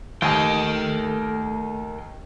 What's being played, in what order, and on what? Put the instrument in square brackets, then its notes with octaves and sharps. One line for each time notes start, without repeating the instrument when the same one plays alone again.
[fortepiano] D#2 G#5 [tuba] A3 [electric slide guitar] A#4 G5